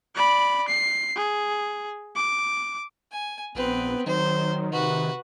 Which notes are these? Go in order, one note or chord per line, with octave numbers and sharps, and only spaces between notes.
D5 B5
C7
G#4
D6
G#5
A#1 B3 C4 B4
D#3 F#3 C5
C3 F#4 B4